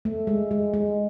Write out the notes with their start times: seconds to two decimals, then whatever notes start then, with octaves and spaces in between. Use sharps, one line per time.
0.05 A3
0.27 G#3
0.51 G#3
0.74 G#3